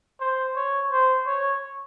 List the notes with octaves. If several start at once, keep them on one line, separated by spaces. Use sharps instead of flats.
C5
C#5
C5
C#5